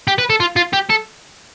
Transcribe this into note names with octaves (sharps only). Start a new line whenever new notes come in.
G4
B4
A4
F4
F4
G4
A4